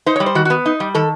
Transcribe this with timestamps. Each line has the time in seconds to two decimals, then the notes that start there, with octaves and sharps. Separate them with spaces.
0.06 D#4 C5
0.16 C#5
0.20 G3
0.26 C5
0.35 D#3 F#4
0.45 F#4
0.50 B3
0.66 D#4
0.80 G3
0.95 D#3 A4